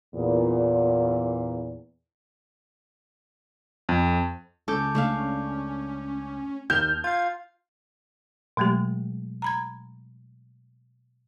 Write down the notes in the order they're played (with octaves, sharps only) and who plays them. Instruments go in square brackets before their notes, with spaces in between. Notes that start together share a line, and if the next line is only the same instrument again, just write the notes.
[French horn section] E2 A#2
[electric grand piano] F2
[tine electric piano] C#2 D6 G6 [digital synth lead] C#4 [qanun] A4
[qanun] A3 D4 F5
[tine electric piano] D#2 D#3 F6 [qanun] A5 [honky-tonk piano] G6
[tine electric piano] F4 F5 [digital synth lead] G#6
[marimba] B2 F#3 G#3 A3 G4
A#5 B5 G#6